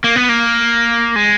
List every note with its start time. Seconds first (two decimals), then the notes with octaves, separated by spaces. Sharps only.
0.04 A#3
0.16 B3
0.29 A#3
1.16 G#3